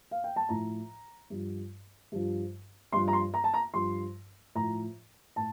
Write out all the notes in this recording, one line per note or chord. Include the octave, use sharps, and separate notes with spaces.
F5
G5
A5
A2 F3 A#5
G2 F3
G2 F3
G2 F3 C6
A#5
C6
A#5
A5
A#5
G2 F3 C6
A2 F3 A#5
A2 A5